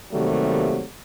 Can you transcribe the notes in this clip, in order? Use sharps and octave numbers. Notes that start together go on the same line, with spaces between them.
C3 D#3 F#3 G3 A3 A#3